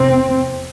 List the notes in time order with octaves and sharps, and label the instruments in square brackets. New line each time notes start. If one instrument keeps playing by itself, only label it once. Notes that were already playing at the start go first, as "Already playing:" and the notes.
Already playing: [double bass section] F1 E2 C3 C4